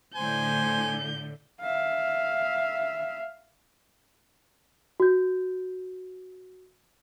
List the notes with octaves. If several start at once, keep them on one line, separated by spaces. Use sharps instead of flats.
A2 D3 C5 G#5 G6
E5 F5
F#4 G6